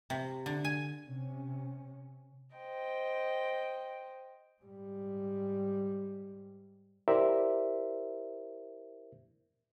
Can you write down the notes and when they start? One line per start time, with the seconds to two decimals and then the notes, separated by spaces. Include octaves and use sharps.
0.10 C3
0.46 D3
0.65 G#5
1.07 C3 C#4
2.56 C5 D#5 G5
4.62 G#2 G3
7.08 E4 G4 A#4 C5 D5 E5